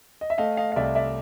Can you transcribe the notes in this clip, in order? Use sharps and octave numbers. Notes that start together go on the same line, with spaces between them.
D#5
E5
A3 D#5 F5
D#5 F5
F5
C2 D5 E5
D5 E5